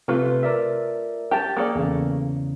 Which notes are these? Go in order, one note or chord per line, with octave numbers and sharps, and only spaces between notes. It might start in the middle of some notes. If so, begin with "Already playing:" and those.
C3 A3 F4 B4
A#4 D5 E5
G4 G5 A5 A6
A#3 G#4 A4 D5
E2 C#3